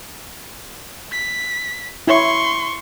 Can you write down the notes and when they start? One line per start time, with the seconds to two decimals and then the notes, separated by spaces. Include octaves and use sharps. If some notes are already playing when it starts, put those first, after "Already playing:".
1.12 B6
2.07 E4 C#5 C6 C#6